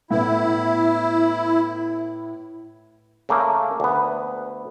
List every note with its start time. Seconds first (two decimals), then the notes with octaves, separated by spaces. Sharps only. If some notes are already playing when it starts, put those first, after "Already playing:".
0.11 A2 B3 E4
3.29 C#3 A3 A#3
3.80 D2 B3